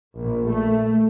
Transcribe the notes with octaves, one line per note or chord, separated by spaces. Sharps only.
A#1
A3